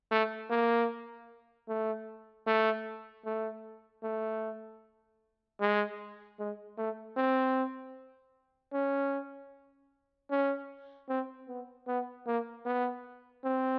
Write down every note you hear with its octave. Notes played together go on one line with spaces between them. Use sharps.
A3
A#3
A3
A3
A3
A3
G#3
G#3
A3
C4
C#4
C#4
C4
B3
B3
A#3
B3
C4